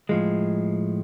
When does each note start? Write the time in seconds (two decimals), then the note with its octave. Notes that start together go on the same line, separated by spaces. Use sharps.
0.09 A2 F3 G#3